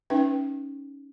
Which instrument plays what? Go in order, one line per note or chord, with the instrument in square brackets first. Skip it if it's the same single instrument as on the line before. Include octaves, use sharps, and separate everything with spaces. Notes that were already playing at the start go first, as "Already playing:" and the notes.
[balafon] C#4 D#4 B4 E5 G5